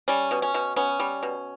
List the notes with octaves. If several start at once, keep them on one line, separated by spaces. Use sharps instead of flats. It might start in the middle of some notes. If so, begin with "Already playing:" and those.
G3 C#4
B2
C#4
B2
B3 C#4
G3
B2